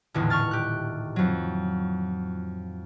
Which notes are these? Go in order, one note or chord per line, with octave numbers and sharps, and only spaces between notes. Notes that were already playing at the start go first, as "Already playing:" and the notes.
D#1 E2 A2 D3
C#6 F6 A6
G4 F#6
F2 F#3